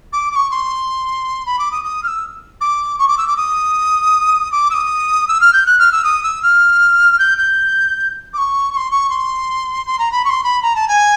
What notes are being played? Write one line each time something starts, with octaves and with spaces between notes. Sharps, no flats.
D6
D6
C#6
C6
B5
D6
D#6
D#6
F6
E6
D6
C#6
D6
E6
D6
D#6
D6
E6
D#6
E6
F6
G6
F#6
F6
E6
D#6
E6
F6
G6
G6
D6
C#6
C#6
C6
C#6
C6
C6
A#5
B5
C#6
C6
B5
A#5
A5
G#5